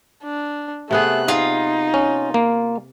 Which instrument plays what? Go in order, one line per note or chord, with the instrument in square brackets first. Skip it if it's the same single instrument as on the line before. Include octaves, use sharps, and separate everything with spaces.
[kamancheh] D4
[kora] C3 B3 G#4 [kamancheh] A3 F#6
[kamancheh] D#4 [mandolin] F4 [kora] G#4
[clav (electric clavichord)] C#4
A#3